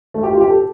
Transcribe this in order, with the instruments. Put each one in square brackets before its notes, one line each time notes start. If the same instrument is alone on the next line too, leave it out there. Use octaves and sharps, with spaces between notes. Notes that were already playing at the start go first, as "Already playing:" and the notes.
[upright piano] A3
G4
F4
G4
A4